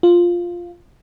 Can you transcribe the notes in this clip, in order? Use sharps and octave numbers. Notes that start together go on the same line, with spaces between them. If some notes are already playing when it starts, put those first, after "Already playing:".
F4